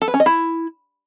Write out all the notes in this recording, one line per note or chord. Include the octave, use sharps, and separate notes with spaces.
A4
B4
C#4
D#5
E4